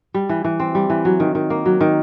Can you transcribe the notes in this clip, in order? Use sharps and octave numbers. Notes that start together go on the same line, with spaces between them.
G3
E3
E3
C4
G3
E3
F#3
D#3
D#3
A#3
F#3
D#3